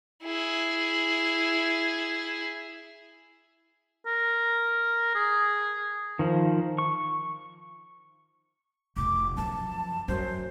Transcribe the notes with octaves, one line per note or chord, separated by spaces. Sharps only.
E4 G#4
A#4
G#4
D#3 F3
C#6
F1 B2 D6
F#2 F3 A5
F#2 F#3 C5